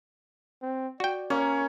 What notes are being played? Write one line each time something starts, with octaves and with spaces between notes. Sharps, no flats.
C4
F#4 D5 G5
A#3 C#4 C#5